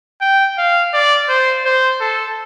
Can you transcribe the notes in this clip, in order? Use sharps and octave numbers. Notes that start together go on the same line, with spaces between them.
G5
F5
D5
C5
C5
A4